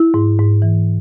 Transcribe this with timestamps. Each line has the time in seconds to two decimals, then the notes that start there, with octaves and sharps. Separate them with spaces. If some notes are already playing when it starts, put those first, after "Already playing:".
Already playing: E4
0.14 G#2
0.39 G#2
0.62 E3